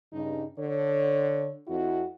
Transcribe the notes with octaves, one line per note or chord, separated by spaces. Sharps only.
G2 C#3 D#4
D3 C#5
F2 E4 F#4